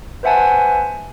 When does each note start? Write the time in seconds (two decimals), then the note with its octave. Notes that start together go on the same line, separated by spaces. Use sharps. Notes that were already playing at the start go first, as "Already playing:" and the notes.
0.23 B4 C5 E5 F#5 G#5 A5